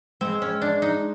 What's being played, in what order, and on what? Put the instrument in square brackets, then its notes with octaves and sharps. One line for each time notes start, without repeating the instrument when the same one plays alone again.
[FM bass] G#3 [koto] C4
[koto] C#4
D4
D#4